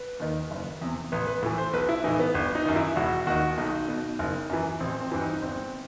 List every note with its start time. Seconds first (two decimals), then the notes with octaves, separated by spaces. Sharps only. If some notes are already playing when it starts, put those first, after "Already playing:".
Already playing: B4
0.20 D#2 D#3
0.51 F#1
0.81 E2 C3
1.12 A1 B4
1.27 B4
1.42 A2 E3
1.58 C5
1.73 B1 B4
1.89 E4
2.04 A2 E3 D#4
2.19 B3
2.34 G1
2.55 D#4
2.66 F#2 D#3
2.76 E4
2.96 E1 F#4
3.27 D#2 D#3 F#4
3.58 B1 D#4
3.88 B2
4.19 F#1
4.50 F#2 E3
4.80 A1 C4
5.01 C4
5.12 G2 E3
5.21 D#4
5.42 G1 C4